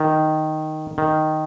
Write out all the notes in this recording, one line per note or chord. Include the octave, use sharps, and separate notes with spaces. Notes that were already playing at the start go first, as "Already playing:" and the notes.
Already playing: D#3
D#3